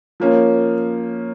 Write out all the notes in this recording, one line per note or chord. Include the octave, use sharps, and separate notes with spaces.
F3 A#3 C#4